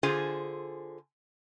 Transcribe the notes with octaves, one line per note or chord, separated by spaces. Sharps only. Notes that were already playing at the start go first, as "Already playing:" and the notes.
D3 F4 G#4 C5 G#5